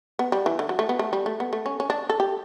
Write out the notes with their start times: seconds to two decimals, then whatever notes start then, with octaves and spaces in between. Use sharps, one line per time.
0.19 B3
0.32 G3
0.46 E3
0.59 D3
0.69 F#3
0.79 A3
0.89 B3
0.99 A3
1.13 G3
1.26 A3
1.40 B3
1.53 A3
1.66 C#4
1.80 C#4
1.90 D4
2.10 A4
2.20 G4